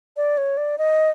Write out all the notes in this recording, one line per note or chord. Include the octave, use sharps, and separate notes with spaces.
D5
C#5
D5
D#5